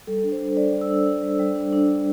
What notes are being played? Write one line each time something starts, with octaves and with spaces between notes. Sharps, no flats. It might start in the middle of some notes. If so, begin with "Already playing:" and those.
G3 A4
D4
C5
D4
G3 D5
G3
E6
D4
D4
G3
G3
D4
D4
G3